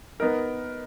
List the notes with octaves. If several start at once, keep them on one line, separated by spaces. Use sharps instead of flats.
B3 D#4 A#4